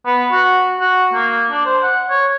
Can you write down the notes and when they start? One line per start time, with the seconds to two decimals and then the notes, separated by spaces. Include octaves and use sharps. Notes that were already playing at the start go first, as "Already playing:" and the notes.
0.06 B3
0.32 F#4
0.80 F#4
1.14 A#3
1.51 D4
1.66 C5
1.83 F#5
2.10 C#5